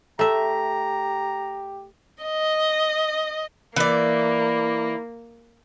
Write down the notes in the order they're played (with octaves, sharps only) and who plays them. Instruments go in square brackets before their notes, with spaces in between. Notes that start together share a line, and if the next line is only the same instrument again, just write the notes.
[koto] A3 E5 [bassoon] G4 [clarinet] A#5
[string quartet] D#5
[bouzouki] E3 D5 [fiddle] A#3